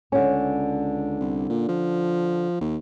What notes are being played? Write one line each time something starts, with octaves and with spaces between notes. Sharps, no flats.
C#2 D3 C#4
C2
A#2
F3
D#2